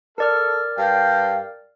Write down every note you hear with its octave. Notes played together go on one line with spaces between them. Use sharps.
A4 A#4 D5 F6
G2 F5 G5